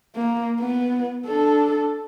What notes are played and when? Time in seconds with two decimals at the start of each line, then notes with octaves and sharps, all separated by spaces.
0.16 A#3
0.60 B3
1.27 D4 A4